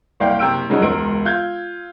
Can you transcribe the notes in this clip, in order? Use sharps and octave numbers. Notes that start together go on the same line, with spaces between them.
F#1 C2 D5 F5 G5
F#1 C3 G5 E6 D7
G2 C#3 F3 F#3 C#4 D#4
E1 C#2 A#4 D7
F4 G6 G#6